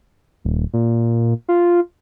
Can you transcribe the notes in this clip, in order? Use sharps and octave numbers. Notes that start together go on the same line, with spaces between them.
D#1
A#2
F4